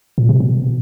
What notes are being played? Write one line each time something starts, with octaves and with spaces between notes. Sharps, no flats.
A#2
C3
B2